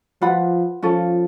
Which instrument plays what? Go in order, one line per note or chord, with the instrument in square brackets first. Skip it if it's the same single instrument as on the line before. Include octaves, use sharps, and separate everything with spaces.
[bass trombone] F3 [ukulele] F4 B4 F#5 B5
[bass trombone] F3 [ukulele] C#4 F4 A4